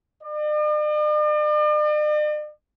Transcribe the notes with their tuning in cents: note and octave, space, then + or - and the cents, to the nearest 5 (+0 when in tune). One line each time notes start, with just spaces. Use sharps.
D5 +45